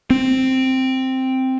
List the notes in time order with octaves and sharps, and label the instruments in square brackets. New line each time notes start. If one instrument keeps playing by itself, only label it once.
[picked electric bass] C4